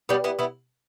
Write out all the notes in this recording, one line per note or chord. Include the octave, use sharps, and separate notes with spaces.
G3 B3
B3 E4
B3 E4